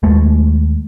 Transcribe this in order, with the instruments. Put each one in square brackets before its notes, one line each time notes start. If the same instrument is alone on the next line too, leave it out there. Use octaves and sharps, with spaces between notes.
[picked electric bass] D#2 G#3 A3